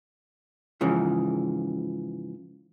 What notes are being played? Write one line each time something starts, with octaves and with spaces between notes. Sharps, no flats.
G#2 C#3 E3 F3